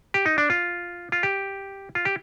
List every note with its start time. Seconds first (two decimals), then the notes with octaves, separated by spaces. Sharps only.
0.14 G4
0.26 D#4
0.38 D4
0.50 F4
1.12 F4
1.23 G4
1.95 F4
2.05 G4